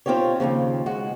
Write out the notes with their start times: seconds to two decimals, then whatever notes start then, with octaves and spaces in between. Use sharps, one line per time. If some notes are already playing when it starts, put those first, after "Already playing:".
0.06 C4 D#4 F4 G4 C#5
0.40 D#2 A2 C#3 F3
0.86 G#3 F#4